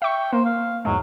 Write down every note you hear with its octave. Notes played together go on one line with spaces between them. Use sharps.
E5 G5 C#6
A#3 C5
F5
E2 G#2 F#3 G#3